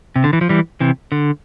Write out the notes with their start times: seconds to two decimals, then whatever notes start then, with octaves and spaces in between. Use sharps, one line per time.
0.16 C3
0.24 D3
0.33 E3
0.41 F3
0.49 E3 G3
0.80 C3 E3
1.12 D3